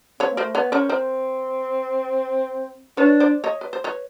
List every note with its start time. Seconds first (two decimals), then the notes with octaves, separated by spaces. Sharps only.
0.20 C4 B4 C#5
0.32 A#3
0.37 A3 A#4 C5
0.55 B3 B4 C#5
0.72 C#4 A#4 C5
0.89 C4 A#4 C5
2.97 D4 B4 C#5
3.20 C5 D5
3.44 C#5 D#5
3.61 B4
3.73 C5
3.84 B4 C#5